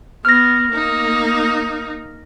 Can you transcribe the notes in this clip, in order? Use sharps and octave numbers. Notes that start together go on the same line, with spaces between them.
B3 F6 A#6
A#3 D#4